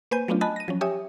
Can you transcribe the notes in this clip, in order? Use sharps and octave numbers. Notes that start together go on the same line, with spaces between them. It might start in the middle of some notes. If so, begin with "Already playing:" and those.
A#3 B4 C5 G#5 G6 D#7
F#3 A3 B3 C#4 D4 F4
D#5 G#5 A5 B5 F#6
A#6 D#7
F3 F#3 C#4
G4 C#5 E5 G#5 D#6